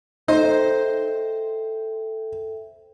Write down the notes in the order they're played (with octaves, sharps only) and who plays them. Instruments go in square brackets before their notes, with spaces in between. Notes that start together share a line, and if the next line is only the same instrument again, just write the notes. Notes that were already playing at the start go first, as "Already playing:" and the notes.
[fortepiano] D#4 [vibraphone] A4 E5 G5 [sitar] C5